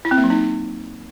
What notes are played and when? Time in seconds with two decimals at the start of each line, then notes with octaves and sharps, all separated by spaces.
0.05 E4
0.11 C4
0.17 A#3
0.24 F#3
0.30 D#4